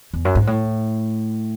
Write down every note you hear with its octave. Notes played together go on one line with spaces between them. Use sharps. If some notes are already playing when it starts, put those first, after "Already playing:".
E2
F#2
G#2
A2